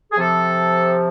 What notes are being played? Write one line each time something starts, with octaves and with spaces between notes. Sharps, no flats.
G#4
C3 F3 A4